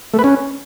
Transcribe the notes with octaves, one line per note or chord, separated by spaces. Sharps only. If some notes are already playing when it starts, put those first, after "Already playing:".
A3
B4
C#4